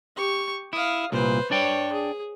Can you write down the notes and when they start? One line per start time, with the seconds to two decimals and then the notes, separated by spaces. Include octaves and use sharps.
0.16 G4 C#6
0.73 E4 F5 D#6
1.12 C2 A#2 B4 C5
1.51 D4 C#5 D5 G5
1.93 G#4